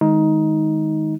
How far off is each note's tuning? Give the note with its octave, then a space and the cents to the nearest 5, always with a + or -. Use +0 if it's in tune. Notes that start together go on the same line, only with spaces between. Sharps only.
D#3 +0 G#3 +0 D#4 +15